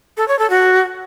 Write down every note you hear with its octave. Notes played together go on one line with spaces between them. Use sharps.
A4
C#5
A4
F#4